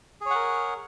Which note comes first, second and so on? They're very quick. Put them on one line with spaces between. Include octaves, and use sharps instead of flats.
G#4 C#5 F#5 A#4